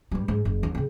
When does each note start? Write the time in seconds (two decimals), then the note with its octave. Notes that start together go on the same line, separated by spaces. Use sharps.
0.11 G2 G3
0.28 G#2
0.45 F#1
0.63 D#2
0.75 C#3 C4